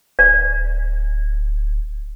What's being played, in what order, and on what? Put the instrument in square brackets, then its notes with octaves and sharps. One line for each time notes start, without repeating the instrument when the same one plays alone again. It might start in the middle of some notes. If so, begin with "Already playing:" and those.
[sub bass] D1 [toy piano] D5